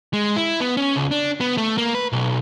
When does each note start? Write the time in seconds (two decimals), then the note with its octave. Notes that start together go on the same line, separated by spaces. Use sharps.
0.13 G#3
0.36 E4
0.60 B3
0.77 C#4
0.96 C#2
1.11 D4
1.41 B3
1.57 A3
1.78 A#3
1.95 B4
2.12 B1